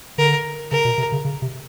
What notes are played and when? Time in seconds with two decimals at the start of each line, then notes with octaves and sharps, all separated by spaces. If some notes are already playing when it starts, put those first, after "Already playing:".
0.18 D3 A#4
0.72 C#3 A#4
0.85 B2
0.98 C3
1.12 C#3
1.25 C#3
1.42 C3